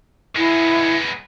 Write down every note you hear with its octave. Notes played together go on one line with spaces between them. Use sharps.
G#3 B3 E4